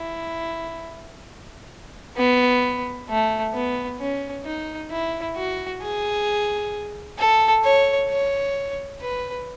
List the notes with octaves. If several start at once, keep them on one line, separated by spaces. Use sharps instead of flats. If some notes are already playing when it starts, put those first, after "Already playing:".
Already playing: E4
B3
A3
B3
C#4
D#4
E4
F#4
G#4
A4
C#5
C#5
B4